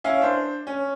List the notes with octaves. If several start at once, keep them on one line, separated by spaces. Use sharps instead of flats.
C#4 E4 E5 F5
D4 C5
C#4